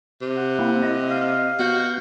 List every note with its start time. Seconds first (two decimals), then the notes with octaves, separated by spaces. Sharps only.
0.22 C3
0.37 F#5
0.59 A#3 C4 E4
0.83 D#5
1.11 F5
1.59 B3 F#4 G6